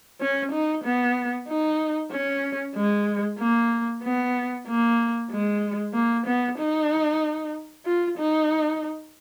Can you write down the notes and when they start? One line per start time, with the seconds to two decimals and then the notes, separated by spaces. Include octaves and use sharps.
0.21 C#4
0.52 D#4
0.85 B3
1.48 D#4
2.12 C#4
2.76 G#3
3.39 A#3
4.04 B3
4.68 A#3
5.31 G#3
5.94 A#3
6.27 B3
6.59 D#4
7.86 F4
8.18 D#4